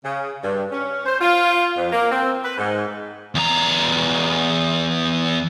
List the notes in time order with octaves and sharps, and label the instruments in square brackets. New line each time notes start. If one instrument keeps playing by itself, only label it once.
[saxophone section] C#3
G2
C#4
C5
F4
F2
A#3
C4
B4
G#2
[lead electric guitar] E2 A#5